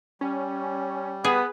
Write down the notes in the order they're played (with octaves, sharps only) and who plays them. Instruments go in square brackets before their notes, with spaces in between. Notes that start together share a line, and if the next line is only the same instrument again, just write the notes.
[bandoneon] G3 [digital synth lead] C#4
[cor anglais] B3 [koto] G#4 [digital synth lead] B4